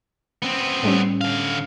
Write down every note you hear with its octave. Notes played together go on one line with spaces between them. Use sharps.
B3 C4
A2 G3 C#4
D3 F5